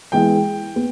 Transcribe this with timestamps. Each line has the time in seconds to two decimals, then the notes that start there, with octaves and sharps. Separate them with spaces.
0.12 E3 G#3 B3 E4 G#4 G5
0.76 B3